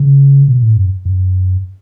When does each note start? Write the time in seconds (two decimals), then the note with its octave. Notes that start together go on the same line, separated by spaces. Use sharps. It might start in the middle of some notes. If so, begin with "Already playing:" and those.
Already playing: C#3
0.48 B2
0.62 A2
0.77 F#2
1.05 F#2